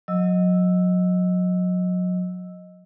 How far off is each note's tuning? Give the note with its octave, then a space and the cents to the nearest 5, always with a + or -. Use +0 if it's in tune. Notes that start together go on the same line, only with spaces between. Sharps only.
F#3 -30 D#5 +0 E6 +0